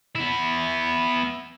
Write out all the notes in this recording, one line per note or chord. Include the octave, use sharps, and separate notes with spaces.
B3 E4